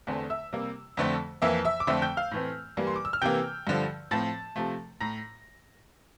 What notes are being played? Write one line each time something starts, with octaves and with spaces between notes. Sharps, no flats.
E2 D3 A3 C4
E5 E6
C3 G3 A#3
F2 D3 A3 C4
F2 E3 A#3 E5 E6
E5 E6
D6
F2 D3 A3 C4 E5 E6
G5 G6
F5 F6
A2 E3 A3 C4
G2 E3 G3 A#3
C6
D6
E6
F6
C3 E3 A#3 G5 G6
G2 D3 F3
A2 F3 C4 A5 A6
C3 F3 A3
A2 A#5 A#6